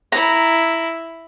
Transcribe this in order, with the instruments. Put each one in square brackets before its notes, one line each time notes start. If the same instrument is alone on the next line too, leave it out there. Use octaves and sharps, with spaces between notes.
[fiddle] E4 [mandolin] A#5